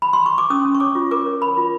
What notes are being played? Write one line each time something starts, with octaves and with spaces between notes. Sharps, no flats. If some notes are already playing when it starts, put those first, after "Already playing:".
B5
C6
C#6
D6
C#4 D#6
C#4
C#6
C#5 D6
F4
A#4 D6
C#5
A#4 B5
F4